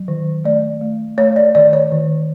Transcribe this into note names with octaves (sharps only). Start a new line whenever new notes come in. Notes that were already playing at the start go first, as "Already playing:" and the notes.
Already playing: F#3
D#3
A3 D5
A3
A3 C#5
D5
D#3 D5
C#5
D#3